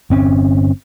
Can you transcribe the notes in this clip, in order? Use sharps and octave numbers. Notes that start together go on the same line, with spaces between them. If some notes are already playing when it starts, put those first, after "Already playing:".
G1 C4 C#4